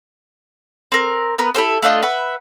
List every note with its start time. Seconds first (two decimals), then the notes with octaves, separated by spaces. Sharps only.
0.92 C4 A#4
1.38 B3 A#4 B4
1.55 E4 G4 A4 C5
1.82 A3 D4 F4 D#5
2.02 B4 E5 F#5